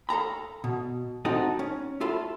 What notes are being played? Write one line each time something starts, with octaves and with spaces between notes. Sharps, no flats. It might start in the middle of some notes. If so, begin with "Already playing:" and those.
A4 F5 A#5 B5
B2
C4 D#4 F#4 A4 D#5
C#4
E4 F4 A4 B5